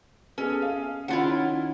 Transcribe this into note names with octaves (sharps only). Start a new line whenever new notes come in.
B3 C#4 G#4 A4
G#4 F5
D#3 C#4 D4 E4 F4 F#5